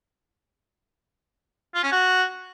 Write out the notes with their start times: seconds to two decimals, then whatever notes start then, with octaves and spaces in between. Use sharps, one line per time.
1.74 F4
1.83 C#4
1.92 F#4